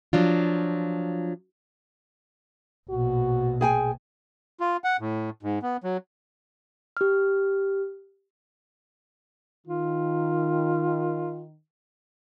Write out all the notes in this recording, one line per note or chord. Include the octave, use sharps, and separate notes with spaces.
F3 F#3 D4 F4
A#1 B2 F#4
G#4 G5 G#5
F4
F#5
A2
G#2
B3
F#3
G4 F6
D#3 F4